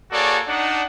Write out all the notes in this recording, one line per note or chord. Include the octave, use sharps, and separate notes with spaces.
A#3 F#4 G#4 A4 C#5 D5
D4 D#4 F#5